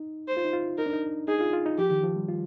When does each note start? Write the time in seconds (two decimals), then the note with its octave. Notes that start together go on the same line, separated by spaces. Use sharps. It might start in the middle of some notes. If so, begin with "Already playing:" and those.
Already playing: D#4
0.28 C5
0.37 F4
0.45 D#4
0.53 F4
0.78 D#4 A#4
0.86 D4
0.93 D#4
1.28 D#4 G#4
1.41 F4
1.53 F4
1.66 D#4
1.78 F3 G4
1.91 D#3
2.03 F3
2.16 G3
2.28 F4